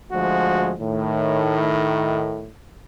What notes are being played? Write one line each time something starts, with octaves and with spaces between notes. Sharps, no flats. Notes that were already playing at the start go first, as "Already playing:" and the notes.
D2 F3 G#3 F#4
A2 D#3